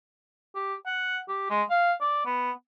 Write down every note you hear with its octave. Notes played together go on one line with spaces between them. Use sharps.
G4
F#5
G4
G#3
F5
D5
B3